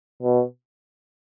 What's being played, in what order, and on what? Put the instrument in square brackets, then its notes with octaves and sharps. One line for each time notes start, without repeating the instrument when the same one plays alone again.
[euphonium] B2